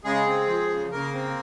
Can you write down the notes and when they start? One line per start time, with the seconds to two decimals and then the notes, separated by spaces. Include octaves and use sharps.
0.04 C#3 G#3 G#4
0.26 C4
0.48 F3
0.70 C#3
0.91 C#3 A#3 A#4
1.13 C4